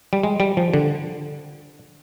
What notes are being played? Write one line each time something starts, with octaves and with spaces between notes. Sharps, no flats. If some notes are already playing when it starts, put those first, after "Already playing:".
G3
G#3
G3
F3
D3